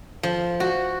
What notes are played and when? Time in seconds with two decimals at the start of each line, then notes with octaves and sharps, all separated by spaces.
0.23 F3
0.60 F#4